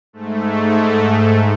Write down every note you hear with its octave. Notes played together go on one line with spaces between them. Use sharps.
G#2 A3